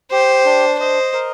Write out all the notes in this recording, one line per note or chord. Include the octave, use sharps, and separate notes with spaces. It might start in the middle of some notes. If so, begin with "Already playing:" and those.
G4 C5
D4
C5 D#5
A#4